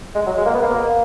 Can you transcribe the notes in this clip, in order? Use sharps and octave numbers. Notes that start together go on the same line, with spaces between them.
G#3
F#3
G#3
A#3
B3
A#3